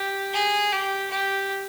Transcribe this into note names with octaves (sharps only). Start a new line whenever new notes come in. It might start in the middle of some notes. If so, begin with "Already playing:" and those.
Already playing: G4
G#4
G4
G4